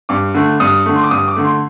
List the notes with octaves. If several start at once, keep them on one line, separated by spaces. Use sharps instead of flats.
G2 D6
D3 A3
G2 D#6
D3 A3
C6
D6
G2 D#6
D6
D3 A3
C6